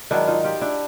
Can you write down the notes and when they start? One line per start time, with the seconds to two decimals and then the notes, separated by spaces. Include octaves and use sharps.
0.10 G#2 D#3 F#3 D4 E4
0.28 D#4 F4
0.44 F4 G4
0.61 D4 E4